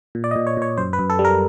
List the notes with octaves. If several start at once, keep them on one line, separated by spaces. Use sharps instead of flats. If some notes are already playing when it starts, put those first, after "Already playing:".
A#2
D5
D#5
A#2
C#5
A#2 C#5
F#2 C5
B4
F#2
A4
G3
A#4